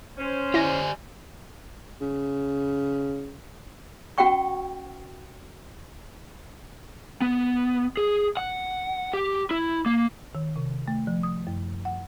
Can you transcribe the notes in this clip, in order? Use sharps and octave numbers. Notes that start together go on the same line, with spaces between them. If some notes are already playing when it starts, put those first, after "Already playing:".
C#4 C5
E4 G4 D5 G#5 A#6
C#3
C#4 F#4 F#5 G5 C#6
B3
G#4
F#5
G4
E4
A#3
D#3
C3
A3
F3
D#6
F#2
F#5